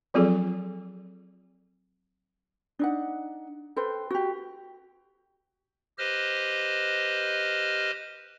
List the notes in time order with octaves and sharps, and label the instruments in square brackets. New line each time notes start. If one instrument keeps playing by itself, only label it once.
[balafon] F3 F#3 C4 F4 G#4 A4
[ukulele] D4 D#4 F#5
A4 B4 C5 G5
F#4 G4
[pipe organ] G4 B4 C5 D#5 F6